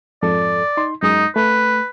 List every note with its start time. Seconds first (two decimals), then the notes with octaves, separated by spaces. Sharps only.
0.23 F2 G#2 A4 D5
0.77 D#4 C6
1.03 F#2 G#3 D#4 D#6
1.36 A3 B4